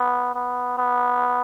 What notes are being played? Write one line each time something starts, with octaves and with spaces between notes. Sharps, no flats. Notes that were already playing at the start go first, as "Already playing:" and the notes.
Already playing: B3
B3
B3